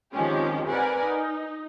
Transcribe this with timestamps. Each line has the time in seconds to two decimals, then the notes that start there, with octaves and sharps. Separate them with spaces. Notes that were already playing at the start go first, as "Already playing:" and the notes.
0.13 C3 D#3 F3 G#3 C#4 G4
0.68 C4 A#4 B4 D5 F#5 G#5
1.02 D#4